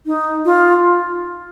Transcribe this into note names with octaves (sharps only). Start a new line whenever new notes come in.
D#4
F4